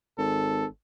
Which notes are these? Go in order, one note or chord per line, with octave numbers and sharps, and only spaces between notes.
G#1 A4